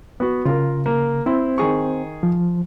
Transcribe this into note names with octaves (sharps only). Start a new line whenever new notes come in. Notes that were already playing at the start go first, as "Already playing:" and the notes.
B3 F#4
C#3 F4 A#4
A#3
C4 E4 C5
D#3 G#4 C#6
F3